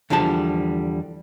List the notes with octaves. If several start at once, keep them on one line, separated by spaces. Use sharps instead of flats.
E2 D3 F3 G3 A5